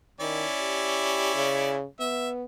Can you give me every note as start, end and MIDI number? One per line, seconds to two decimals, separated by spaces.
0.20 0.45 51
0.20 1.75 61
0.20 1.75 64
0.20 1.75 74
0.60 1.33 67
1.35 1.84 49
2.00 2.45 59
2.00 2.29 76